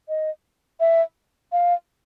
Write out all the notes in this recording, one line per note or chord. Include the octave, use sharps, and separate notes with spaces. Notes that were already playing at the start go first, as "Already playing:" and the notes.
D#5
E5
F5